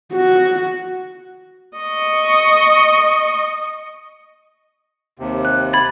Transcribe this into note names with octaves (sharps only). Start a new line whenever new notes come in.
F#4
D#5 C#6
D#2 C3
F#6
B5 G#6 A6